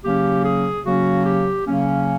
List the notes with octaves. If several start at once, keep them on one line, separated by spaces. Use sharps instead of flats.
C#3 F#3 A#3 C#4 G4
G#4
C#3 F#3 A#3 C#4 F#4
G4
C#3 F#3 A#3 C#4